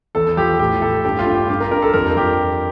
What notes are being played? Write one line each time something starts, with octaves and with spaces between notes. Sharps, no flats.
E2 A4
F3 G4
A2 G4
A2 A4
G2 G4
F4
G2
G4
G2 G4
A#4
G2 A#4
A4
F2 A#4
F3 G4